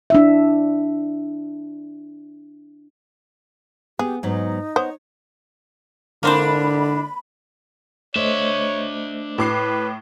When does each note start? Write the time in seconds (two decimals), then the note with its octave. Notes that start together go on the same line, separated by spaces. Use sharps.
0.10 D4 E4 E5
3.99 B3 G4 G#4
4.23 G#2 F#3 B3 D#4
4.76 B3 C5 C#5
6.23 G#2 D3 A#3 C4 D4 A#4 C5 B5
8.16 A3 D4 C5 C#5 D#5 E5
9.38 A2 B4 D6 C7